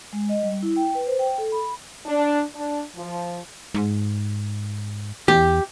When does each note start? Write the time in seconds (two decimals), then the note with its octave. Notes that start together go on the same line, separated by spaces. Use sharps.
0.13 G#3
0.29 D#5
0.43 G3
0.63 E4
0.76 G5
0.95 B4
1.07 C5
1.19 G5
1.38 A4
1.52 B5
2.06 D4
2.55 D4
2.95 F3
3.74 G#2
5.28 E2 G4